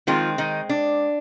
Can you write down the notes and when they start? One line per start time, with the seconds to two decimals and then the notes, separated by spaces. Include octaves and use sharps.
0.07 D#3 F3 G#3 C4 F4
0.38 D#3 D#4
0.69 D4